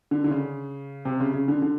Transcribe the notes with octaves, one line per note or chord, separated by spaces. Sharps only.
D3
D3
C#3
C3
C#3
C#3
D3
D3